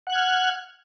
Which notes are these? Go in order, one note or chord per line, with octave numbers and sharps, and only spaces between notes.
F#5 F6 F#6 G#6